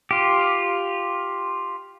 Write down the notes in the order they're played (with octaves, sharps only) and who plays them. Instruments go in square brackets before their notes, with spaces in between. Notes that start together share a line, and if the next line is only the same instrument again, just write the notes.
[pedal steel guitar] F4 G4